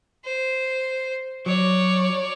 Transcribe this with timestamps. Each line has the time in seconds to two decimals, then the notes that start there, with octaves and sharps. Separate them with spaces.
0.25 C5
1.46 F#3 C#5 D5